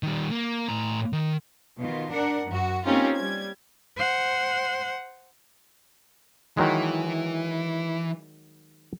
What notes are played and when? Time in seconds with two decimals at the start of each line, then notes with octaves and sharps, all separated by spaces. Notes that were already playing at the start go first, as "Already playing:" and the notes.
0.03 D#3 G3
0.31 A#3
0.69 A2 A#5
1.13 D#3
1.78 B2 D#3 F4
2.10 D4 A#4 F#5
2.47 F#2 F#4
2.83 A#3 C4 C#4 D#4 F4 G4
3.16 G3 G#6
3.97 C5 F#5
6.57 D#3 E3 F#3 G#3